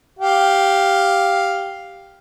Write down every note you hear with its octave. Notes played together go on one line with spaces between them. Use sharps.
G4 F5